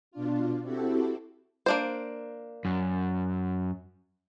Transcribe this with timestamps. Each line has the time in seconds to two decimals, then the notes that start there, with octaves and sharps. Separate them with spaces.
0.11 B2 D4 F4
0.63 C4 E4 F#4 G4 A4
1.66 A#3 D4 C5
2.65 F#2